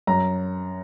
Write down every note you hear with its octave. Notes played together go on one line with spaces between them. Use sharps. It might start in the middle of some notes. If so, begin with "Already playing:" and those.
F#2 A#5